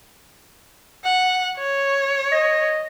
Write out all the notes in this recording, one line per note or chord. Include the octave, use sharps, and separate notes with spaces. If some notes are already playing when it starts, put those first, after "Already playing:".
F#5
C#5
D#5